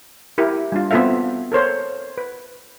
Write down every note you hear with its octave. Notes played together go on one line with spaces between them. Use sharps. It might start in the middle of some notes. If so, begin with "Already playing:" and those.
E4 G4 A#4
G3 D4 F4
B3 C4 F4 A4 E5 F5
A4 A#4 C5 C#5
B4